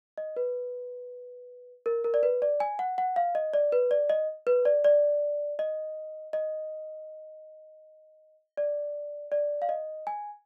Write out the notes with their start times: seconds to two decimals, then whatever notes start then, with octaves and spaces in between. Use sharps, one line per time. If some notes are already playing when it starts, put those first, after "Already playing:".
0.18 D#5
0.36 B4
1.86 A#4
2.04 A#4
2.14 D5
2.23 B4
2.42 D5
2.60 G#5
2.79 F#5
2.98 F#5
3.16 F5
3.35 D#5
3.54 D5
3.72 B4
3.91 D5
4.10 D#5
4.47 B4
4.65 D5
4.84 D5
5.59 D#5
6.33 D#5
8.57 D5
9.32 D5
9.62 F5
9.69 D#5
10.07 G#5